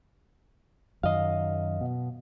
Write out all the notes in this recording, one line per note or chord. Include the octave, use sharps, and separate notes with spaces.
F#2 D#3 D#5 F5
B2